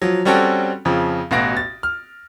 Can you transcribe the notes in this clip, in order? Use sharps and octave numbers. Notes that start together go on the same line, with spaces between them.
F3 F#3
G3 C4 C#4 F#4 A4 G5
F2 C#3 F3
A1 B2 F#4 F5 A#6 D7
A6
F6